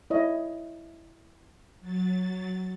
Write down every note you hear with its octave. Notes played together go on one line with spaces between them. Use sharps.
E4 C#5 D#5
F#3 A6